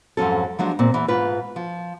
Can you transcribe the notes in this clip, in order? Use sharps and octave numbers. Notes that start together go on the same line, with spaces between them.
F2 G#2 F#3 C#4 A4
F3 F#3 G#3 D4
A#2 C4
E2 E3
G#2 F4 B4
F3